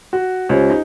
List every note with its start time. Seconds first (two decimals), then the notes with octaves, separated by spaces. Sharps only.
0.13 F#4
0.49 C#2 C#4 F4 G4 C5
0.70 D#4